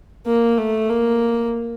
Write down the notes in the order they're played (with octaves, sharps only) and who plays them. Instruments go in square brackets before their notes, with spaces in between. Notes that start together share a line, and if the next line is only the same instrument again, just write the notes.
[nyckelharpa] A#3
A3
A#3